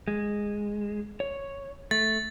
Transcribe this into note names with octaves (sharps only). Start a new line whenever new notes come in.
G#3
C#5
A3 A6